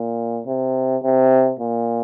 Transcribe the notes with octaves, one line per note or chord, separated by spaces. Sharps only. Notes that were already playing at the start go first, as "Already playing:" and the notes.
Already playing: A#2
C3
C3
A#2